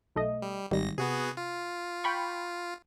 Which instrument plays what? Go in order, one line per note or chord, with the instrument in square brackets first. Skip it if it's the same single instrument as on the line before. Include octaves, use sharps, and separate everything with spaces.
[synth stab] B1 A3 D#5
[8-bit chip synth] G3
[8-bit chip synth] G#1 A#6 [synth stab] D#3 G3
[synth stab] C3 [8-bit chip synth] B3 F#4 G#4
[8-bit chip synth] F4
[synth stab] G5 B5 C#6